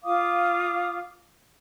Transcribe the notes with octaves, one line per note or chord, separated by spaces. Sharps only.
F4 F5 D6 D#6